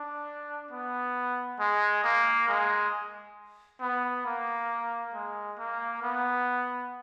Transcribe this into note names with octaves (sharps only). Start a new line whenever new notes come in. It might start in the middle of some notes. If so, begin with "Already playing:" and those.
Already playing: D4
B3
G#3
A#3
G#3
B3
A#3
G#3
A#3
B3